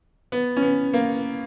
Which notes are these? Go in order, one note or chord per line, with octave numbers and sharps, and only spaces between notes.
B3
C#4
B3
A#3